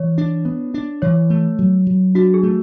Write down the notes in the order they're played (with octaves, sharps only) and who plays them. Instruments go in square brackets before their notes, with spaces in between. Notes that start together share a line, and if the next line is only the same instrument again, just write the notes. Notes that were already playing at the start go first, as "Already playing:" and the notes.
Already playing: [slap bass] E3 [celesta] C#5
[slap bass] D4
B3
D4
[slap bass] E3 [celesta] C#5
[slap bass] A3
F#3
F#3
[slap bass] D4 [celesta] F#4
[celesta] G#4
[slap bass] A3